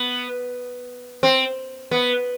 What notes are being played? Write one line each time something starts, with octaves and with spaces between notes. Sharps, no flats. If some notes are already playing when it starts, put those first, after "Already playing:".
Already playing: B3
C4
B3